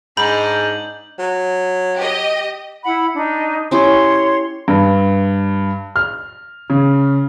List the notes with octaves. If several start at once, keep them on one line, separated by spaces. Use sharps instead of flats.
G#2 D4 D#4 B5 G6 F#7
F#3
G4 D#5
E4 F#5 B5
D4 D#4
C#4 E4 G4 C#5 C6
G2
F6
C#3